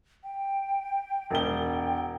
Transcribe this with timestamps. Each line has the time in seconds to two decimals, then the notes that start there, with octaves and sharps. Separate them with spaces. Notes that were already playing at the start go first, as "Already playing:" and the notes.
0.24 G5
1.30 E1 G5 G7